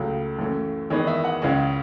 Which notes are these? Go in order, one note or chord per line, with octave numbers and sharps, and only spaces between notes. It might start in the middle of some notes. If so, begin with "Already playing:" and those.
Already playing: C#2 C#3 F#3 A3
F#2 E3 A3 C#4
E2 D#3 G#3 B3 C#5
E5
F#5
C#2 C#3 G#3 C#4